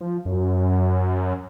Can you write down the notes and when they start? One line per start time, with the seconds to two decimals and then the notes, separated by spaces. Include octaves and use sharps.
0.01 F3
0.25 F#2